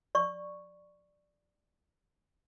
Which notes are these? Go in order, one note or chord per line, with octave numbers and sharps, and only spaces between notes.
D5 C#6